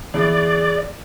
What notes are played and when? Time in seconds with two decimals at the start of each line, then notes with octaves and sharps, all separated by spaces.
0.14 E2 G#4 D5